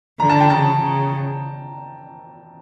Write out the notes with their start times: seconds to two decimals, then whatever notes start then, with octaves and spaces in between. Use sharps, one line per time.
0.20 D3 A#5
0.29 A5
0.40 G5
0.50 C#3 A5
0.82 C#3